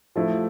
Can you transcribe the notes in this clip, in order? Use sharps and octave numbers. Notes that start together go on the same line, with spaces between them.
F3 A3 E4